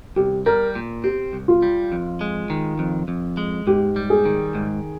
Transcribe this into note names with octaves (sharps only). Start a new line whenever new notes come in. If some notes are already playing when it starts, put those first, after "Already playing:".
C2 G4
G3 A#4
A#2
C4 G4
C2
F4
G3
F2
G#3
D#3
F2
F2
G#3
G#2 G4
G3
G#4
D#3
G#2